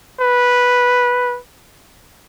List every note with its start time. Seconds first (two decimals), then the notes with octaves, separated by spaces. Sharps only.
0.21 B4